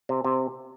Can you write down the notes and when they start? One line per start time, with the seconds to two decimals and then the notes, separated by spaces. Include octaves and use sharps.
0.09 C3
0.24 C3